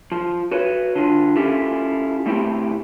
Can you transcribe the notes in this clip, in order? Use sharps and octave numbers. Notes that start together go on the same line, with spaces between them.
F3
F#4 B4 C#5
D3 F4
C#4 E4 F4 G4 A4
B2 A3 C4 E4 G4